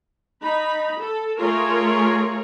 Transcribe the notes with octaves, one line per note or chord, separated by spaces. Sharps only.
D#4 B5
A4
A3 F4 G#4 A#4 C#5